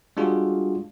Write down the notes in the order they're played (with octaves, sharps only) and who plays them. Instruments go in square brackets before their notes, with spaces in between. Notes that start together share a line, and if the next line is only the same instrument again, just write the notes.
[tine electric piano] G3 G#3 D4 F4 F#4 G#4